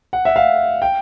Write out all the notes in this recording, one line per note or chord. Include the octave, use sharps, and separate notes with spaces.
F#5
E5
F5
G5